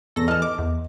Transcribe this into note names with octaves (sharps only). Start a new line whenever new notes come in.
E2 A4 A#6
E3 D#5 A5 F6
D#5 D6
E2